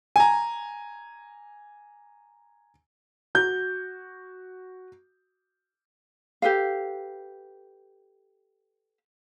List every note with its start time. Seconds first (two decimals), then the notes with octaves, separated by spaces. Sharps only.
0.16 G#5 A#5
3.35 F#4 G6
6.42 G4 A4 B4 F5